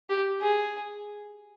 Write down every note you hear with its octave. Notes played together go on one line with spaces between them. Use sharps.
G4
G#4